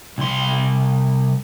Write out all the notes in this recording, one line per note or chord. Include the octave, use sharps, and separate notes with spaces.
C2 C6